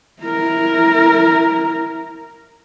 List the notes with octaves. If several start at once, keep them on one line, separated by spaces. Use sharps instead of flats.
E4 A#4